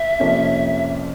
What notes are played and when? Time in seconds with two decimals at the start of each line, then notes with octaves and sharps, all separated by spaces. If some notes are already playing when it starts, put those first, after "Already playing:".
Already playing: E5
0.20 F2 C3 F3 A#3 C#4